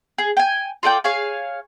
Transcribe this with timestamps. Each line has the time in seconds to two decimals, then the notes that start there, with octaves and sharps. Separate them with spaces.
0.18 G#4
0.37 G5 G#5
0.83 F4 A4 D5 G5
1.04 G#4 C#5 F5 G#5